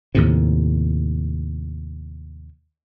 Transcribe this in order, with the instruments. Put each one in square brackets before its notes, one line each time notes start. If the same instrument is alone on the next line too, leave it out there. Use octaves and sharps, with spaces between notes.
[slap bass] D#2 A2 C3